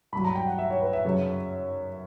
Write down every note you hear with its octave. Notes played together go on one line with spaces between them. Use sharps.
G2 F#3 B5
A#5
G5
F#5
E5
C#5
B4
E5
F#2 C#3 F#3